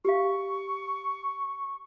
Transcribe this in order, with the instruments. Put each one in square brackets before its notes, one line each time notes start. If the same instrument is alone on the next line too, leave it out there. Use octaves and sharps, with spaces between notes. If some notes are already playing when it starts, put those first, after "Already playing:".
[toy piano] G4 F5 [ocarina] C#6